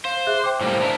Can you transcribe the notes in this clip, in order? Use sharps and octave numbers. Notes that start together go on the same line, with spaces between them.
C5 F5
G#4 E5 F#6
G5 D6
A2 G3 A#3 C5
D4 E4 A#4